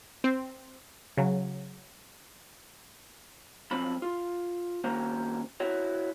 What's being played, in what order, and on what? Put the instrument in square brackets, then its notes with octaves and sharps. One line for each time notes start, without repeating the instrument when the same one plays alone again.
[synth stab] C4
C#3 F#3
[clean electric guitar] F#2 F3 C4 B5
F4
D#3 A#3 C#4 F#4 C5 A#5
E4 F#4 C#5